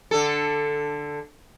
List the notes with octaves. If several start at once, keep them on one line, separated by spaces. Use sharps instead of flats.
D3 A4